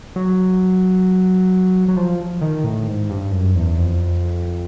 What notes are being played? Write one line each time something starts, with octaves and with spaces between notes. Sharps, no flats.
F#3
F#3
F3
D#3
A2
G#2
G2
F#2
E2
F2